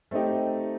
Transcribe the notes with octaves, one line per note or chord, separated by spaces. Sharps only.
A3 C4 D#4 G4